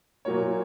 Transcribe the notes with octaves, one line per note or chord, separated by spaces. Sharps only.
A#2 F#3 A#3 C#5